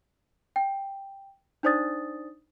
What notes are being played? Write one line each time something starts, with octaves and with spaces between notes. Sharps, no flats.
G5
D4 D#4 C5 D5 D#6 A6